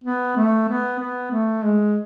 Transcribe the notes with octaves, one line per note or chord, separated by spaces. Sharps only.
B3
A3
B3
B3
A3
G#3